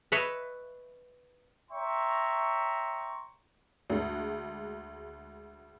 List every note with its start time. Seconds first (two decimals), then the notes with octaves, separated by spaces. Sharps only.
0.12 B4 C#5 D#5 E5
1.71 C#5 E5 G5 A#5 C6 C#6
3.90 D2 G#3